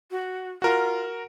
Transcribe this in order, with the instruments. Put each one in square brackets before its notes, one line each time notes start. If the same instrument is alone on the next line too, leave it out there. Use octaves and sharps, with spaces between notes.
[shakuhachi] F#4
[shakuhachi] F4 [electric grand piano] F#4 A#4 A#5